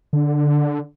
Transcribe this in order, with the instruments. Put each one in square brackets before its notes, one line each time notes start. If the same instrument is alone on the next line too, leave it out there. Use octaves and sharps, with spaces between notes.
[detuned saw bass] D3